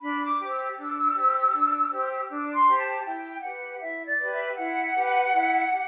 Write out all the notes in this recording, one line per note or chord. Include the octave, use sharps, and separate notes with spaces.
D4 B5
D6
G4 C5
E6
D4
G4 C5
D4
G4 C5
D4
C6
G4 C5
A5
E4 G5
G4 B4 F#5
E4 E5
D5
G4 B4
E5
E4 F#5
G4 B4
E4
G4